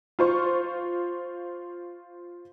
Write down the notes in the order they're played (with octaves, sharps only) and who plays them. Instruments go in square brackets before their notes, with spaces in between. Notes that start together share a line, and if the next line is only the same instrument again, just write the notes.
[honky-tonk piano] F4 C5 C#6